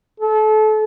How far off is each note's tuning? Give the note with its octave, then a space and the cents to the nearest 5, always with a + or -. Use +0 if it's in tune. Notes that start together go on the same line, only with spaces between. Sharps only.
A4 -30